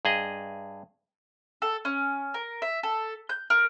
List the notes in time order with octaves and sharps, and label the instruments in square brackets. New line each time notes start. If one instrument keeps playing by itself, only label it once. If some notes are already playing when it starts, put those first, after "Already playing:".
[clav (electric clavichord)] G2 G#4 D#5
[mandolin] A4
C#4
A#4
E5
A4
G6
A#4